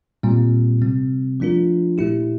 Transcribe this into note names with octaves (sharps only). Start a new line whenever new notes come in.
A#2 G3 C4
C3 G3 C4
F3 A3 D4 F4 A#4
A#2 A3 E4 G4